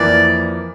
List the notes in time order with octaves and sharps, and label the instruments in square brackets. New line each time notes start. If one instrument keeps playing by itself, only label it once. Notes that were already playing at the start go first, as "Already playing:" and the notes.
Already playing: [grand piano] F2 E3 A#3 [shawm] D5